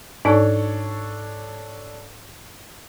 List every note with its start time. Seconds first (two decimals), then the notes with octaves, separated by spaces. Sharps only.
0.25 G#2 D4 D#4 A4 C#5 D5